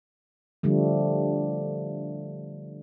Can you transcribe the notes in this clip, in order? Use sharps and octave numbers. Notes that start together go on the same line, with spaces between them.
D3 F3 G3 A3